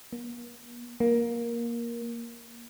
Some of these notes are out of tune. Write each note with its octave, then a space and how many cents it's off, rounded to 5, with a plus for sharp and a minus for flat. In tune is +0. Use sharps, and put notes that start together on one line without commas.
A#3 +45
A#3 +15